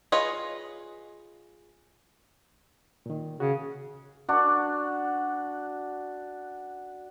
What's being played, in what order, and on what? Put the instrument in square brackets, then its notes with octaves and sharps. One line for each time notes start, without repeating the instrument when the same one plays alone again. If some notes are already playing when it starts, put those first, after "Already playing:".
[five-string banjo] F4 G#4 B4 C#5 D#5
[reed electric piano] A#2 D#3
[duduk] C#3 [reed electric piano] F#4
[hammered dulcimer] D4 F#4